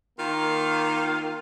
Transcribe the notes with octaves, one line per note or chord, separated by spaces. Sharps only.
D#3 A#3 F4 F5